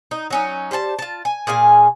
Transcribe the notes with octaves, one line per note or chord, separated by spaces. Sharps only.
D#4
F#3 C#4 D#4
G3 C5 G#5 A5
F4 A5
G#5
A#2 G#4 F5 G#5